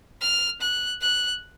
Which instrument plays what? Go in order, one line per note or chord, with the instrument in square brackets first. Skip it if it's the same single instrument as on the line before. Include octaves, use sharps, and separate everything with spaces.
[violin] F6
F#6
F#6